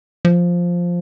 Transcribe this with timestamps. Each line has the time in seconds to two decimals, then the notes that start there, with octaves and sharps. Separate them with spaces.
0.25 F3